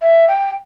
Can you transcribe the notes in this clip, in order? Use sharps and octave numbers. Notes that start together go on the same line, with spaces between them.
E5
G5